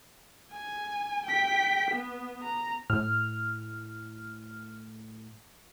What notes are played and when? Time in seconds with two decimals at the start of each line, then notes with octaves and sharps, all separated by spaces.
0.51 G#5
1.26 G5 B6
1.91 B3
2.43 A#5
2.90 A2 F6